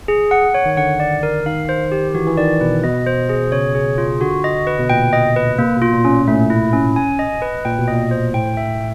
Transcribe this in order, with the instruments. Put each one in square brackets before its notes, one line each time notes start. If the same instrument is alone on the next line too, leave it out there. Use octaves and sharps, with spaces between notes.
[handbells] G#4
F#5
C#5
[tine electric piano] D#3
[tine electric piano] D3 [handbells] F#5
[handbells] D5
A#4
[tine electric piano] D#3 [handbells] F5
[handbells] C5
G4
[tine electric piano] E3 [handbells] F#4
[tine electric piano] E3
[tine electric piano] D#3 [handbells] D5
[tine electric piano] B2 [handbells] B4
[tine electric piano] B2 [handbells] D#5
[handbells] C5
G#4
[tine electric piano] C#3 [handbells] C#5
[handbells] G#4
F4
[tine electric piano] D3 [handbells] F#4
[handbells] D#5
B4
[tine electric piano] B2
[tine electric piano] A#2 [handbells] G5
[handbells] D#5
B4
[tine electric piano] C3 [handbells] A#3
[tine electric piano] B2
[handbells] F4
[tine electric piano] A#2
[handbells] C#4
[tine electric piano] A#2
[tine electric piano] A2 [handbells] A3
[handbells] E4
C#4
G#5
D#5
B4
[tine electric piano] A#2 [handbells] G5
[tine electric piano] B2
[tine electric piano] A#2 [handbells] D#5
[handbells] C5
[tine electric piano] A2 [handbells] G5
[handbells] E5